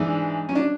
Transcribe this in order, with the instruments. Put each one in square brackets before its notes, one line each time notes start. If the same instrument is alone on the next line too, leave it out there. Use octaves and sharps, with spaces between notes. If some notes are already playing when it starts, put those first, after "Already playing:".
Already playing: [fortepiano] G#2 E3 D4
C#4
D4